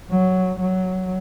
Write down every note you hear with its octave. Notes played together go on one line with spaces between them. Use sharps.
F#3
F#3